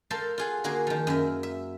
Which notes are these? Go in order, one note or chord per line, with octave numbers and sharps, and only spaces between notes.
A4 A#4 C5 F5 A5
F4 G#4 F#5
D3 A#3 F#4 G#4
D#3 F3
F#2 A#4 E5
E5